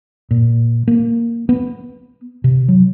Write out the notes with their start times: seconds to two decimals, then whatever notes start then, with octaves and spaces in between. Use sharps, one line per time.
0.31 A#2
0.88 A#3
1.49 B3
2.44 C3
2.68 F#3